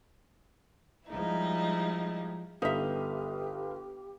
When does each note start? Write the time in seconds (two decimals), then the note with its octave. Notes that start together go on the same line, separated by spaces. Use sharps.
1.09 F3 G3 G#3 D#4 E4
2.62 G1 D#4 G4 A4 B4 E5 F5 D#6